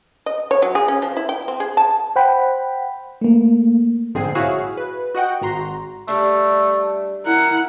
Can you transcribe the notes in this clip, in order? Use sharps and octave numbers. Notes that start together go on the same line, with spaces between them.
D#5
C#5
F#3
G#4
C#4
F3
E4
G5
C4
G#4
A5
C5 F#5 G5 B5
A3 A#3
A#1 G#2 D3 C4 G#4 C7
E4 F#4 G#4 C#5 E5 F5
B4
F#4 D#5 F#5 G5
G#1 F#4 A#5 C6
G3 A3 D4
E4 A#4 F#5